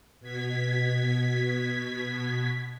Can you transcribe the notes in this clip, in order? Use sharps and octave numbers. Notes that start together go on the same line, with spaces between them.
B2 G#6 B6